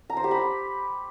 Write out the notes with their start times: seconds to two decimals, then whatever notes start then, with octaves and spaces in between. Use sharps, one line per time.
0.10 A#5
0.17 C5
0.24 G4
0.31 B5